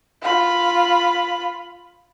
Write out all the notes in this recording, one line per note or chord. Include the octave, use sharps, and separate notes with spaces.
F4 B5